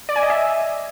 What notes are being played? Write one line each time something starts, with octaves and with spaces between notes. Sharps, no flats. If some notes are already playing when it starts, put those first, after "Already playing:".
D5
G#5
D#5
E5